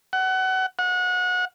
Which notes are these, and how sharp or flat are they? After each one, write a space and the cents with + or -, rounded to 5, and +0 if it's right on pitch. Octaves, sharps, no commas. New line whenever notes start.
F#5 +25
F#5 -30